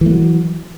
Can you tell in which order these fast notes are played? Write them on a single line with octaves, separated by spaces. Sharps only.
E3 A3 F#3